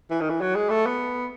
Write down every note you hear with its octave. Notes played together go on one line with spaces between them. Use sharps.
E3
D#3
E3
F#3
G#3
A3
B3